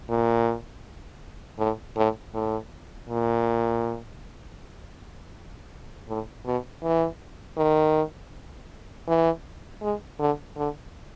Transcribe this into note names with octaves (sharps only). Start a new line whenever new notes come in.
A#2
A2
A2
A2
A#2
A2
B2
E3
D#3
E3
G#3
D3
D3